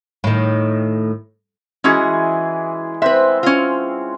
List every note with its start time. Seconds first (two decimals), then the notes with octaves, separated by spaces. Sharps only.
0.24 A2 D#3
1.84 E3 G#3 C#4 E4 F#4 G#4
3.02 C4 B4 C5 E5 F#5
3.43 C#4 F4